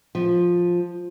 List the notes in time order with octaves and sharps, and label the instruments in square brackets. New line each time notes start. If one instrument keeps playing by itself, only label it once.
[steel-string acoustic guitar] F3